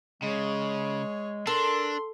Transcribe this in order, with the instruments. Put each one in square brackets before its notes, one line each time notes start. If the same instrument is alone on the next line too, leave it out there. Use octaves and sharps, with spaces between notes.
[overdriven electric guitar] C#3 [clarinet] G#3 [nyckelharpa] G#4 C#5
[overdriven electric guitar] D4 [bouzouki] A4 [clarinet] A#4 [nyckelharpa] C6